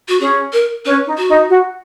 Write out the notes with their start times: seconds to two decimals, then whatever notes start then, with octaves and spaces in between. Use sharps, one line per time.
0.08 F#4
0.20 C#4 G#4
0.53 A#4
0.85 C#4 B4
1.06 D#4
1.17 F#4
1.29 D#4
1.49 F#4